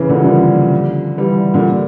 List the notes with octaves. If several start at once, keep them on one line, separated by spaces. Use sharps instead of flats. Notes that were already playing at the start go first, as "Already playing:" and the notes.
Already playing: C#3 E3
A#2 D3
G3
D3 F3
E3 G3
A#2 D3